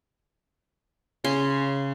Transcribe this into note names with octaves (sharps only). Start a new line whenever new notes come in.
C#3 C#4 C6